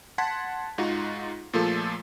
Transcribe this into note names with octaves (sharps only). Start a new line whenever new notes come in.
F#5 A5 C6 G#6 B6
G#2 D#4 F4 F#4
A#2 F3 A3 F4 G#4 A4